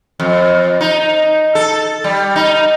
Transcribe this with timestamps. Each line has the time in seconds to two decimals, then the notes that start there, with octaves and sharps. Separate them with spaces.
0.20 F2
0.81 D#4
1.55 A4
2.04 G3
2.36 D#4